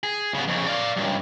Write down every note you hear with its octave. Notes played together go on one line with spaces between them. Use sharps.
G#4
C#3 B3
F2 C#3
D5 F5
C#2 G2